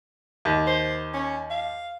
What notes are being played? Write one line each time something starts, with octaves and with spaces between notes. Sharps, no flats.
D#2
C5
C#4
F5